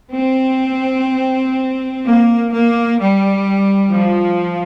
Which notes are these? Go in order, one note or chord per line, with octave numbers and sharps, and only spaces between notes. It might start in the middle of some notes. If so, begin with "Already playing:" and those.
C4
A#3
A#3
G3
F3